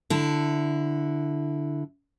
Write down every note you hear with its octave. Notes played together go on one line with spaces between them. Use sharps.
D3 E4